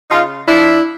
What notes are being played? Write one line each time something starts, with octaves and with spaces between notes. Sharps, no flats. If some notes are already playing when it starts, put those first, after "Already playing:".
C#3 D#4 F4
F3 D4 E4